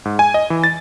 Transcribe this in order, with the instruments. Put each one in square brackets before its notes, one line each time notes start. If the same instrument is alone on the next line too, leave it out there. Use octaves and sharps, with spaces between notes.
[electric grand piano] G#2
G#5
D#5
E3
A6